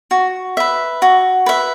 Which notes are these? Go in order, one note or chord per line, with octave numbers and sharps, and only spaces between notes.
F#4
B4 E5
F#4
B4 E5